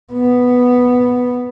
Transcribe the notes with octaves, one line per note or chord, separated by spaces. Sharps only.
B3